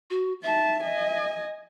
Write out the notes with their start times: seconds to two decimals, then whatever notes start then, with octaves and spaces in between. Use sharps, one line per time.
0.10 F#4
0.43 D#4 E5 A5
0.83 D#5 G#5